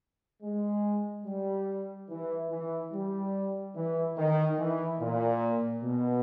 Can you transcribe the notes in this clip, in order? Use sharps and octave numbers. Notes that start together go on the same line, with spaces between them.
G#3
G3
E3
E3
G3
E3
D#3
E3
A#2
B2